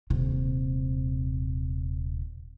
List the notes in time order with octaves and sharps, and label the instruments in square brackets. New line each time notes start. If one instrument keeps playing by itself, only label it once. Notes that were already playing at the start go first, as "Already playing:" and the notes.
[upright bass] D#1 C3